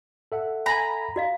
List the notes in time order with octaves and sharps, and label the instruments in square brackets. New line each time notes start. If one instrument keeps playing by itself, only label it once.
[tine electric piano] A4 E5 F#5
[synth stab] G#5 B5 [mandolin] A#5
[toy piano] F#4 D#5 F5